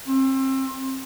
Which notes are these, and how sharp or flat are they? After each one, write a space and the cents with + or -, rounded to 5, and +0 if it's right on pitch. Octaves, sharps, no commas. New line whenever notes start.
C4 +30